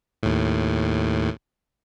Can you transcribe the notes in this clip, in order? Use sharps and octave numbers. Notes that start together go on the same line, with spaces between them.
D#2 A2